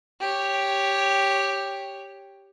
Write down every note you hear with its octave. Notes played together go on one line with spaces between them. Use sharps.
G4 C#5